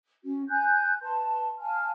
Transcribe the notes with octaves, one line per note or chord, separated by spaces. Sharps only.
C#4 F#4
G#5 F#6 G6
B4 A5 C6
F5 G#5 A5 F6